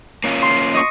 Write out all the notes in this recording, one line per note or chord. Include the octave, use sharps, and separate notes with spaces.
A#3 C#4 F4
C6
D#5 C#6